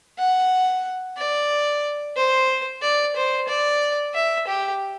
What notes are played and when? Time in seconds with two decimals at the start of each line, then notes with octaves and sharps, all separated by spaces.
0.18 F#5
1.18 D5
2.16 C5
2.82 D5
3.16 C5
3.48 D5
4.14 E5
4.47 G4